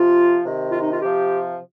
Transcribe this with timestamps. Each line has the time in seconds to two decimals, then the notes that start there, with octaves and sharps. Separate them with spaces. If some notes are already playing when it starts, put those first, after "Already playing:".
Already playing: C3 F3 F4
0.44 C3 D#3
0.72 F4
0.81 D#4
0.92 F4
1.00 C3 F3 G4